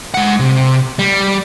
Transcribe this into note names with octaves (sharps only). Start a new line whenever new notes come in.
G#3 F#5
C3
G3